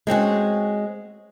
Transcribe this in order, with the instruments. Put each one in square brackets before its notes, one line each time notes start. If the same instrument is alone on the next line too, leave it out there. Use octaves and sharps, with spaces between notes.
[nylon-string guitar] G#3 C4 C#4 F#4